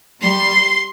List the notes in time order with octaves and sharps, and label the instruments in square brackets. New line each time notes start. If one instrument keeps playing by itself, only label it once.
[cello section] G3 [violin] C6